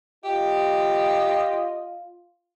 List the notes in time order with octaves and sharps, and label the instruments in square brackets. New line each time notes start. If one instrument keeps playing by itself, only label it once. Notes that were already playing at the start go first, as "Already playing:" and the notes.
[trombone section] F4 [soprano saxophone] G4 [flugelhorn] D#5